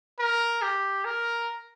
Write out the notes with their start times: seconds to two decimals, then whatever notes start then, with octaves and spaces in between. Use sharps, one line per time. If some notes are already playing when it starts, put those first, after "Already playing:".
0.20 A#4
0.62 G4
1.05 A#4